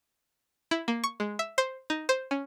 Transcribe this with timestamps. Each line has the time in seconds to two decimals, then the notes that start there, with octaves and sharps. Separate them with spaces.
0.71 E4
0.88 A#3
1.04 C#6
1.20 G#3
1.39 E5
1.58 C5
1.90 D#4
2.09 C5
2.31 C#4